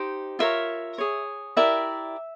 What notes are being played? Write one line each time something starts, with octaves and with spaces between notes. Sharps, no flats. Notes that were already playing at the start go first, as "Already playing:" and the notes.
Already playing: D#4 G4 C5
F4 A#4 C#5 E5
G#4 C#5
E4 G4 A#4 D5 E5